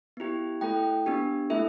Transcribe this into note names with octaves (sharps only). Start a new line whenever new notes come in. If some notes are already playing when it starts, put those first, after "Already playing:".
B3 E4 G4
A3 E4 A4 G5
B3 D4 G4
A3 E4 A4 E5